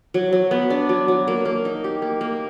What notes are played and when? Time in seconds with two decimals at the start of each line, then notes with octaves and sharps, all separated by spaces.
0.14 F#3
0.33 F#3
0.51 B3
0.70 D4
0.89 F#3
1.08 F#3
1.28 A#3
1.45 A#3
1.65 D#4
1.84 G4
2.02 A#3
2.21 A#3